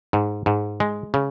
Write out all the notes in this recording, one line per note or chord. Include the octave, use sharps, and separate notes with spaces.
G#2
G#2
G#3
C#3